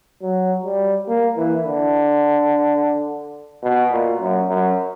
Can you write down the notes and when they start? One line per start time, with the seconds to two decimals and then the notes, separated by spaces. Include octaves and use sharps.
0.22 F#3
0.65 G3
1.08 A#3
1.37 E3
1.64 D3
3.63 B2
3.92 A#2
4.21 F#2
4.49 F#2